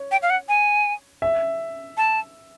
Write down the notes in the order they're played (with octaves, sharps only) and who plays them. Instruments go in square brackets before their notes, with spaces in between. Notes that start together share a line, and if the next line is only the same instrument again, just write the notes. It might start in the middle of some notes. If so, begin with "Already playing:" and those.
Already playing: [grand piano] C#5
[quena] G5
F5
F#5
G#5
[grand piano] E5
[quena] A5